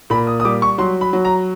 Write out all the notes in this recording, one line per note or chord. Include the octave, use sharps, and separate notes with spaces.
A#2 B5
D#6
D#6
G3 D6
C#6
F#3 C6
B5
F#3
A#5